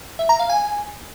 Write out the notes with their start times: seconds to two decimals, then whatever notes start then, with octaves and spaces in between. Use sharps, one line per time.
0.19 E5
0.29 A#5
0.39 F5
0.49 G#5